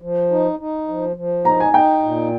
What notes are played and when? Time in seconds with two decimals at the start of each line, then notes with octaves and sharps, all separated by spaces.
0.02 F3
0.31 D#4
0.59 D#4
0.88 F3
1.16 F3
1.45 D#4 A#5
1.60 G#5
1.73 D#4 G5
2.03 A#2